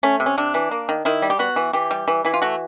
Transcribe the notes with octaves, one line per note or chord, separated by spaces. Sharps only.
A3 C#4
C3
C#4
C3 D4
E3
A#3
D#3
D#3 E4
G3
G4
B3 F#4
E3
E3 G4
G3
E3
E3 E4
F4
A3 F#4